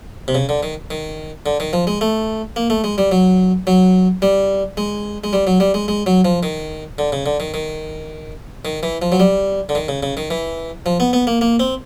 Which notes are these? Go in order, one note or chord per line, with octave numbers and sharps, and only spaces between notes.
C3
C#3
D3
D#3
D#3
D3
D#3
F3
G#3
A3
A#3
A3
G#3
G3
F#3
F#3
G3
G#3
G#3
G3
F#3
G3
G#3
G#3
F#3
F3
D#3
D3
C#3
D3
D#3
D#3
D#3
E3
F3
F#3
G3
D3
D#3
C#3
C#3
D#3
E3
F3
B3
B3
A#3
A#3
C4